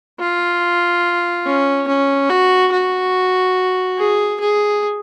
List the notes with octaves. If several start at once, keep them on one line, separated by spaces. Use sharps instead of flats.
F4
C#4
C#4
F#4
F#4
G#4
G#4